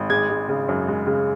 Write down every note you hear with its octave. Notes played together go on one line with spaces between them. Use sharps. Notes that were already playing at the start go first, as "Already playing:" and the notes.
Already playing: G#1
G#3 G#6
G#3
C#3
F#2
G#3
C#3